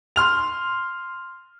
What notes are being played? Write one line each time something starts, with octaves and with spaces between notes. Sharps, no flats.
C6 F6 F7